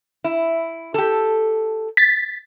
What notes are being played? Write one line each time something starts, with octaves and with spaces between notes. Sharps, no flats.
E4
G4 A4
A6 B6